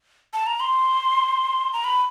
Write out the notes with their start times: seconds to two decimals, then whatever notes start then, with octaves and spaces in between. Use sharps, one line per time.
0.33 A5
0.46 A#5
0.60 C6
1.73 A#5
1.84 B5